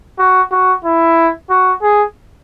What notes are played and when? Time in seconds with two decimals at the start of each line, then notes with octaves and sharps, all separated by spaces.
0.19 F#4
0.52 F#4
0.85 E4
1.50 F#4
1.82 G#4